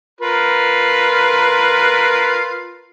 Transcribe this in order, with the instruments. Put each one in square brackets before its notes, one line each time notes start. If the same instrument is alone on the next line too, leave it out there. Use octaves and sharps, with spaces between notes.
[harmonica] F4 A#4 B4